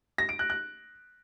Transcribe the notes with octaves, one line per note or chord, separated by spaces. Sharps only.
A#6
D7
F#6
F#6